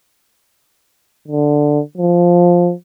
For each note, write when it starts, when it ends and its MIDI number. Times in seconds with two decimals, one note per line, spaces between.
1.28 1.80 50
1.97 2.73 53